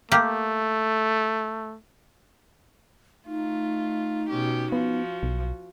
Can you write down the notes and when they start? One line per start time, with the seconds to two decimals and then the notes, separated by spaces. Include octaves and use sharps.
0.12 A3 A#3 G4
3.26 A3 D#4 F4
4.29 B2 C#4 G4
4.72 F3 B3 F#4
5.23 B1